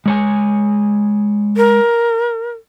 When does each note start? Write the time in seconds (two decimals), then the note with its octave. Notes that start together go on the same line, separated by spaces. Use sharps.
0.06 G#3 C#5 G#5
1.57 A#4